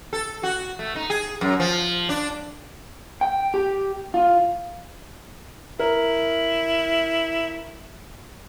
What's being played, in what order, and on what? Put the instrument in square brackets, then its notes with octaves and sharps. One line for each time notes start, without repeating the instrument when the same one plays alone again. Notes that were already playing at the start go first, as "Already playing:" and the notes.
[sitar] A4
F#4
A3
D#4
G#4
F#2
F3
D4
[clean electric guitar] G5
G4
F4
[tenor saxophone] E4 [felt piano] A#4